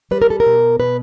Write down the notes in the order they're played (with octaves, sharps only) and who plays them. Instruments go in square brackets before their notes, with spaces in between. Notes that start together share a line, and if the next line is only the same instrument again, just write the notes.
[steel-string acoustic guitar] G3 B4
A#4
A4
A#4
B2
B2 B4